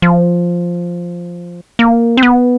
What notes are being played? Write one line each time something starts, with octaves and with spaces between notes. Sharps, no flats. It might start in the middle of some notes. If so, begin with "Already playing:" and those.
F3
A#3
C4
B3